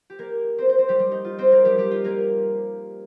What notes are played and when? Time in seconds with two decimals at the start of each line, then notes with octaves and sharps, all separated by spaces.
0.10 G4
0.19 A#3 A#4
0.58 C4 C5
0.68 C4 C5
0.78 C4 C5
0.88 G3 G4
0.99 G3 G4
1.11 D#4
1.25 F4
1.38 C4 C5
1.51 A#3 A#4
1.65 G3 G4
1.78 G3 G4
1.91 F4
2.04 A#3 A#4